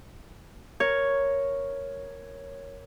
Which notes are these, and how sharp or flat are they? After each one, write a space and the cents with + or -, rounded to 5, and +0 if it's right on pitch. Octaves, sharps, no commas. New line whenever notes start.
A#4 +0 C#5 +0